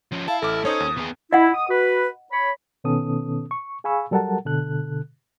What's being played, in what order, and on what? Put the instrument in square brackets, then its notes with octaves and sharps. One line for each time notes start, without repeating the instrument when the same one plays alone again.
[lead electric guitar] F3 C#4
[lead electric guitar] E4 [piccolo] F5 [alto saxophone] A5
[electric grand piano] A1 D6 [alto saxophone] A4 [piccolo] F6
[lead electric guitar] C#4 [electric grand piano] D#4 C5 C#5 [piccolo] D#6
[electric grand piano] D#2
[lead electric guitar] B3 G#4
[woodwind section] E4 [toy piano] D#5 F#5
[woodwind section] D#6
F#4 B4
C#5 B5
[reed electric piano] B2 D#3 B3 C#4 A4 D#6
C#6
G#4 F5 G#5 B5 C#6 E6
F#3 G3 A4 A#4 F#5 A5
B2 D3 A4 F#6